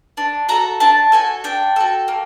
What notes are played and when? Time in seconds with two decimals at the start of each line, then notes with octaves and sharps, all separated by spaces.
0.17 D4
0.49 F#4 A4 A#5
0.80 D4 A5
1.12 F#4 A4 G#5
1.44 D4 G5
1.76 F#4 A4
2.08 A#3